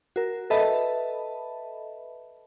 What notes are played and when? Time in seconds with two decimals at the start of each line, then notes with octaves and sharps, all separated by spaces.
0.16 F#4 A#4
0.50 A4 B4 D#5 E5 A5 B5